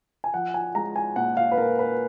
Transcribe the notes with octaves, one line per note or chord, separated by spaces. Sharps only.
G#5
F3 F#5
G#5
G#3 A#5
G#5
A#2 F#5
F5
B4
A#2 A#4
B4